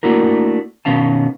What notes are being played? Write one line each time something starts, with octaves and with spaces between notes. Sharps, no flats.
A3 A#3 D4 E4 F#4 A#4
B2 D#3 B3 C#4 F5 A5